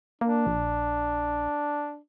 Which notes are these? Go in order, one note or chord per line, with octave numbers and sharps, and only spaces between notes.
A#3 D4
A#1